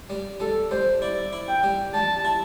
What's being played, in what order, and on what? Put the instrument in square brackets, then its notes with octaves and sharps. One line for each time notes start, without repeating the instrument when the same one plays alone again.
[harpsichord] G3
[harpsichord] G3 [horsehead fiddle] A4
[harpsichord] G3 [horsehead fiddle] C5
[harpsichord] E4 [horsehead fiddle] D5
[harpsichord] E4
[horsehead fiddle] G5
[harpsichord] G3
[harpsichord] G3 [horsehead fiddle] A5
[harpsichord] E4